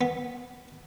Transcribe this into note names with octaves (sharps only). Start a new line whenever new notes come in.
B3